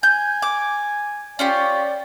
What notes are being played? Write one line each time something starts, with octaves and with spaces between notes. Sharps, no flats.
G#5 G6
D6
C#4 F4 G4 D5